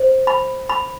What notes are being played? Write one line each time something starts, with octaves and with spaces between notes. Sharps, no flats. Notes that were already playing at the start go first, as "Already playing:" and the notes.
Already playing: C5
B5
B5